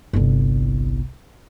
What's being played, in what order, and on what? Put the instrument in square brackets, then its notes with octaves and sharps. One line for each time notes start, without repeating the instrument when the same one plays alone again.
[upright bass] G1 C2